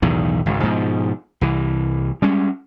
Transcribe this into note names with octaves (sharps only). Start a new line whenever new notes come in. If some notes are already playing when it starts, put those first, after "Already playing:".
B1 E2 A2 D#3
G#1 C#2 G#2
G#2 B2 F3
C2 E3
G3 G#3 C#4